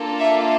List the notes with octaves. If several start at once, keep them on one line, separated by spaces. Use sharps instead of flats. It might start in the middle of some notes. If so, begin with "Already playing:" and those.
Already playing: A#3 D4 F4 A4
E5